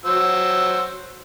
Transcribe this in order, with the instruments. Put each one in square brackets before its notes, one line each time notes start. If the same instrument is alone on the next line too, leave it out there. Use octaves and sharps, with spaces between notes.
[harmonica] F#3 C5 E6